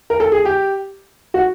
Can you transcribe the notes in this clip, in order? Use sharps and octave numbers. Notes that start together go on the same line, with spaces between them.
A#4
A4
G#4
G4
F#4